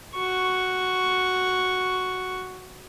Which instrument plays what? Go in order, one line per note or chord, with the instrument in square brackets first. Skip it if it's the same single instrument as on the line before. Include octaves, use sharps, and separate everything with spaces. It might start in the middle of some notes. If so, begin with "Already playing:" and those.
[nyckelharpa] F#4 C#6